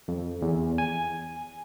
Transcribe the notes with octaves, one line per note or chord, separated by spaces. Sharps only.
F2
E2
G#5